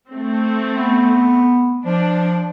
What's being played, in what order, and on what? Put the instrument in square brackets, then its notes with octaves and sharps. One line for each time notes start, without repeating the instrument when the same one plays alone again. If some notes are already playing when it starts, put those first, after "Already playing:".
[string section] A3 C4
[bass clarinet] B3
[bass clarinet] F3 [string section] D4